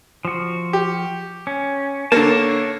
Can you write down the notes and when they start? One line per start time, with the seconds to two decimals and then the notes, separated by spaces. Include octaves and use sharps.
0.25 F3 F#4
0.73 G4
1.47 C#4
2.12 D3 A#3 C#5 A5